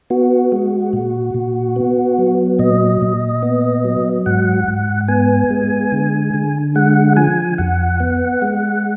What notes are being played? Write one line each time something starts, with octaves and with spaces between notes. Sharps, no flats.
B3 F#4
G#3
A#2
A#2
B3
F#3
A#2 D#5
A#2
B3
F#3
G#2 F#5
G#2
B3 G#5
G#3
D3
D3
G#3 F#5
F3 G#5
F2 F#5
B3
G#3